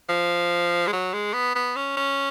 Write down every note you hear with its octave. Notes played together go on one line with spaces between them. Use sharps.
F3
G#3
F#3
G#3
B3
B3
C#4
C#4